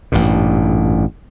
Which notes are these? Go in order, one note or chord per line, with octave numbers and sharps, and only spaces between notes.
A1 G2 A#2